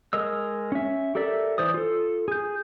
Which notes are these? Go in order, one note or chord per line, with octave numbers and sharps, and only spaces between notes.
G#3 A#4 D#5 E6
C#4 E5
G4 A4 A#4 D5 E5
E3 C5 D5 D#6
F4 A4
G#4 G6